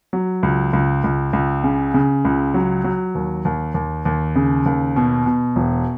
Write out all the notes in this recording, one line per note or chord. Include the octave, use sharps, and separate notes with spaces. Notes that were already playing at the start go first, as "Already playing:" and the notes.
F#3
C#2
C#2
C#2
C#2
C#3
C#3
C#2
F#3
F#3
D#2
D#2
D#2
D#2
C#3
D#2
B2
B2
E1